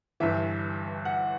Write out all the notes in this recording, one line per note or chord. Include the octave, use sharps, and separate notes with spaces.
G1 G2 E3 E5
F#5